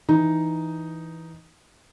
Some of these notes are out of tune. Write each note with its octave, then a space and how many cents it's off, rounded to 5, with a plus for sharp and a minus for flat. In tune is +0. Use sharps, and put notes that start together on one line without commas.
E3 +0 D#4 +0